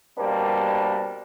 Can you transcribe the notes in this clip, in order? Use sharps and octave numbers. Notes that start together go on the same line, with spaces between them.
B2 G3 A#3 C4 D4